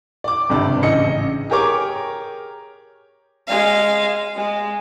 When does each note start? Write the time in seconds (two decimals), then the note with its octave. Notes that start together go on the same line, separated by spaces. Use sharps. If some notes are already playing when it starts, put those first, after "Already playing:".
0.24 D5 D6
0.50 G#1 C#2 G2 C3 D5
0.83 A1 C#3 D#5 C#7
1.50 G4 G#4 A#4 C#5 D6
3.47 G#3 F5
4.36 G#3